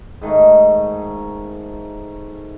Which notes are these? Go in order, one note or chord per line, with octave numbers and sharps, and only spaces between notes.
G#2 D#3 A3